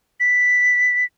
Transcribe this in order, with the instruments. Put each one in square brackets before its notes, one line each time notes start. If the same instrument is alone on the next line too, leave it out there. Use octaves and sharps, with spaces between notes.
[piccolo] B6